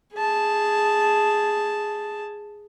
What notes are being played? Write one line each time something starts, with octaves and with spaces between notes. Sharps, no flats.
G#4 A5